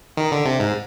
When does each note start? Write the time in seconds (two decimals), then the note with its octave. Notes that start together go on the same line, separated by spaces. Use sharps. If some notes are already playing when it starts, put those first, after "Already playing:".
0.17 D#3
0.32 D3
0.45 C3
0.60 G#2